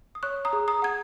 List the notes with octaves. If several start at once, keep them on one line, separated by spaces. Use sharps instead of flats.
D#6
C#5 C#6 F#6
A#5 D#6
G#4
A#5 D#6
F#5 G#6